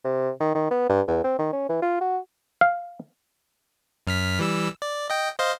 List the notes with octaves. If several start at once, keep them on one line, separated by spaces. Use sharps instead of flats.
C3
D#3
D#3
B3
G2
E2
C4
D#3
C#4
E3
F4
F#4
F5
F#2 F6 B6
E3 G3 E6
D5
D#5 G5
C5 D#5 F5